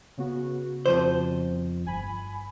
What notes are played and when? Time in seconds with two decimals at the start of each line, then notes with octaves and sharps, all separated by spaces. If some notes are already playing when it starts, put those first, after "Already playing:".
0.18 C#3 B3 F#4
0.86 F2 F3 C5
1.85 G1 G#5 B5